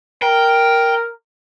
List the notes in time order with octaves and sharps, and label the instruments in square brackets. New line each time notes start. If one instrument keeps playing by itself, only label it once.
[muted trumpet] A#4 [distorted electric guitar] G5